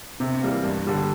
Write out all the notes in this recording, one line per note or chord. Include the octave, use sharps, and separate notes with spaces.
C3
E3 G3 A#3
G2
D3 G3